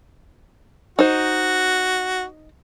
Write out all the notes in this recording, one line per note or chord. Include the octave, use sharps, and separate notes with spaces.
D#4 F#4 C5